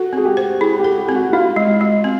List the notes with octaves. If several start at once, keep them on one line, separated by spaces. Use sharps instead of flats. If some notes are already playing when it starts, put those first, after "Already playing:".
Already playing: F#4 A4
C4 G#4
G4
C5
E4 G#4
G4
A4
G4
C4
F#4
E4 F4
G#3
G#3
C4